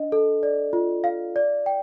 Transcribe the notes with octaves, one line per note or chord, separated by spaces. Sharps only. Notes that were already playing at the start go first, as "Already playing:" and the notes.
Already playing: D4 D#5
A4
D5
F4
F5
D5
G5